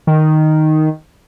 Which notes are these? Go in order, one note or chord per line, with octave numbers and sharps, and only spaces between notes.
D#3